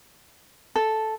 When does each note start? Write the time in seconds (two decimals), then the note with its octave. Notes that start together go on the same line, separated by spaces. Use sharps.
0.76 A4